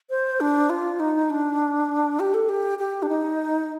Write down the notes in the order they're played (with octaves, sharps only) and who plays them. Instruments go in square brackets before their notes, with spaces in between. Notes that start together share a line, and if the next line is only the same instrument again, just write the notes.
[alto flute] C5
D4
F4
D#4
D4
G4
A4
G4
G4
D4
D#4